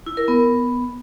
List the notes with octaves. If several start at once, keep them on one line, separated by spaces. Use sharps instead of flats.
E4
A#4
B3